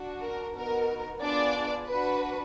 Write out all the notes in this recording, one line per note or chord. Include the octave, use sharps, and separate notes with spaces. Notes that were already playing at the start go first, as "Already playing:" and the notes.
Already playing: D4 F#4
A#4
B3 D#4 F#4 A#4
B3 D4 F4 G#4 D5
D4 F#4 B4